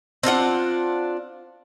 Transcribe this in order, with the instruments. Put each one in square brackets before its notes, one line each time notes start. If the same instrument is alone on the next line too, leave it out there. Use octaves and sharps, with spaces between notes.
[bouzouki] C4 D4 F4 F#5